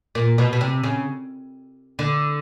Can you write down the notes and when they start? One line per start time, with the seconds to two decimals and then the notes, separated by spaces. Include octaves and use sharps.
0.15 A#2
0.38 B2
0.53 B2
0.61 C3
0.83 C#3
1.99 D3